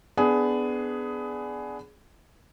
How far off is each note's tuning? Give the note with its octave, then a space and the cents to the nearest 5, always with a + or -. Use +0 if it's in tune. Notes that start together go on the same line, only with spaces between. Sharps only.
B3 +15 D4 +0 G#4 +10